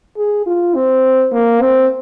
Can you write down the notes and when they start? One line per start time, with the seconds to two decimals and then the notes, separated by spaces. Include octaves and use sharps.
0.17 G#4
0.46 F4
0.75 C4
1.33 A#3
1.62 C4